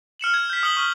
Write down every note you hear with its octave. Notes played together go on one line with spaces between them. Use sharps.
F6 C#7 E7 F#7
G#6
G6 B6
D#6 F6 C#7 F#7 G7
C#6 F6